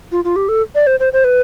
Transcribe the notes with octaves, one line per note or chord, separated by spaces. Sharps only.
F4
F4
G4
A4
D5
C5
C5
C5
B4